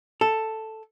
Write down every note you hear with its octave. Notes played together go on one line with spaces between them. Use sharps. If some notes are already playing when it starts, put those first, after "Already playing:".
A4